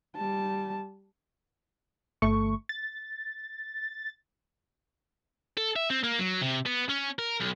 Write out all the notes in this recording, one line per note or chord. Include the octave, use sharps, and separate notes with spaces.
G3 A5
G1 A3 C#6
A6
A4
E5
C4
A#3
F#3
C3
B3
C#4
A#4
B1